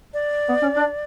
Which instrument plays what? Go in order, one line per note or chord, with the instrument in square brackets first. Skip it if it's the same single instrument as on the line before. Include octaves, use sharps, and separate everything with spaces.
[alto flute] D5
[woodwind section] B3
C#4
D4